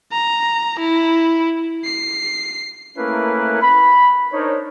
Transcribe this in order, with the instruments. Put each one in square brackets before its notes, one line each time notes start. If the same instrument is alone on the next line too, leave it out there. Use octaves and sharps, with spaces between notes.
[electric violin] A#5
E4
C7
[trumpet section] A3 A#3 C#4 E4 A#4 B4
B5
D4 D#4 A#4 C5 C#5